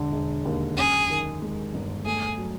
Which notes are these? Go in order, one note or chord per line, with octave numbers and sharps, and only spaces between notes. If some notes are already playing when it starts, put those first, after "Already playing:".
Already playing: E1 D3
E1
D#2
F#2 G#4
D#3
G#3
G1
A3 G#4
F#3